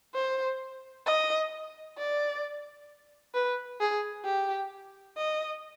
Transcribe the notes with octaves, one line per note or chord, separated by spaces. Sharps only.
C5
D#5
D5
B4
G#4
G4
D#5